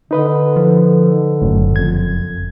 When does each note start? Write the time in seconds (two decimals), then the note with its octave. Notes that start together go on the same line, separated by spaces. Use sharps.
0.11 D3 D#4 B4 D#5
0.56 F3
1.42 F#1 F#2 A2
1.76 F2 G#6